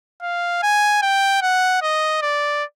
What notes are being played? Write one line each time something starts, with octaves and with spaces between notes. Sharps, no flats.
F5
G#5
G5
F#5
D#5
D5